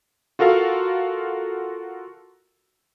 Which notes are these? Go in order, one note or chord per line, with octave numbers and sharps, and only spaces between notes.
F4 F#4 A4 A#4 F5